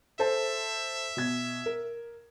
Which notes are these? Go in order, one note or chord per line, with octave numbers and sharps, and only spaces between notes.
A4 C5 E5 A5
B2 G#6
A#4